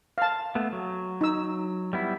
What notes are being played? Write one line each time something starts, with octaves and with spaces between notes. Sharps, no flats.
F5 A5
A3 B3
F#3
D#4 E6
G3 B3 E4